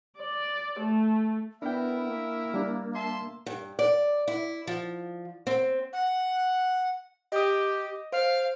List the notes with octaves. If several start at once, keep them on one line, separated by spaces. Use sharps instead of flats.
D5
A3
B3 D4 E4 A#4 E5 G5
A#3
G3 D4
E5 A5 C6
G2
D5
E4
F3
C4
F#5
G4 D#5 D#6
C5 F5